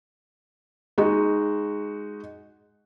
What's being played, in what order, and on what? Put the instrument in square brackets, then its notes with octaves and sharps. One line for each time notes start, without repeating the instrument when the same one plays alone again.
[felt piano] G#3 D#4 F#4